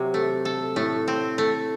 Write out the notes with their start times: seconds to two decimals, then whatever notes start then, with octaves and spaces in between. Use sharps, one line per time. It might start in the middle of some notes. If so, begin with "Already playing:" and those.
Already playing: C3 F#3
0.14 A3
0.45 A4
0.76 A2 A3
1.08 C4
1.38 A3